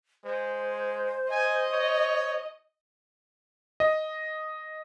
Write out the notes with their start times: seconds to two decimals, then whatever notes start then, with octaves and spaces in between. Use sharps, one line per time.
0.25 G#3 C5
1.31 D#5 G#5
1.73 C#5
3.80 D#5